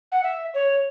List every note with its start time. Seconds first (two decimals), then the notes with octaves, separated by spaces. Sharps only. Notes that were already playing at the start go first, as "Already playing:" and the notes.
0.12 F#5
0.23 E5
0.54 C#5